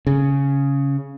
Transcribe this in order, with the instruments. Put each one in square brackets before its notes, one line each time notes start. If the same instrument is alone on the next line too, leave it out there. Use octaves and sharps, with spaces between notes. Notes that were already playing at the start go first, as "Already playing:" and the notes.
[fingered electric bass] C#3